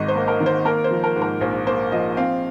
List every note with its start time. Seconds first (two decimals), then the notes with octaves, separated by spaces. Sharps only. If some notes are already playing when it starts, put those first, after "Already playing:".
Already playing: G#1 G#2 D#3 D#5
0.08 C5
0.15 A#3
0.28 A#4
0.40 D#3
0.46 C5
0.65 A#3 A#4
0.84 C5
0.91 F3
1.04 A#4
1.16 G#2
1.22 A#4
1.41 A#1 C5
1.67 A#3 C5
1.92 F3 D#5
2.17 C4 F5